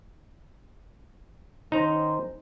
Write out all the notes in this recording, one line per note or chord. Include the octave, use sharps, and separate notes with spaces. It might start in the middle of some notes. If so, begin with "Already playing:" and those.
D#3 C#4 D#4 C5 A#5